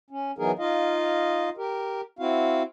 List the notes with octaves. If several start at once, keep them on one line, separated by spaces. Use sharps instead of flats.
C#4
E3 F#3 B3 D#4 G#4 A#4
D#4 F4 D#5 F5
G4 A#4
C4 E4 F#4 F5